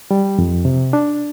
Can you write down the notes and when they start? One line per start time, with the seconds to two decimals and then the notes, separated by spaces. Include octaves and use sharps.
0.11 G3
0.39 F2
0.65 C3
0.93 D4